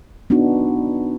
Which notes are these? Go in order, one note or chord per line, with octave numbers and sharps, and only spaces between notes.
B3 D4 D#4 F#4